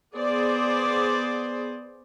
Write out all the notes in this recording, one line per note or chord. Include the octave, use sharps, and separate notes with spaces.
B3 G#4 C5 D5